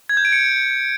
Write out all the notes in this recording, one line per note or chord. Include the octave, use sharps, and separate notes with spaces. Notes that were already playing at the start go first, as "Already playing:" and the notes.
G#6
G6
D7
C#7